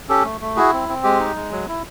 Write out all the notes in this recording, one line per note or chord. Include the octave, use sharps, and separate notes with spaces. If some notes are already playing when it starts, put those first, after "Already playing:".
C#4 G4 A4
A3
A3
E4 F#4 G#4
C4
C4
G#3 G4
D#4
G#3
F#3
E4